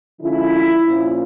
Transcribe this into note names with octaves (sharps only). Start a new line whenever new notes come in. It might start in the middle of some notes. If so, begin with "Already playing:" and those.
D3 F3 G#3 C#4 E4
A#2 F3 A#3 C#4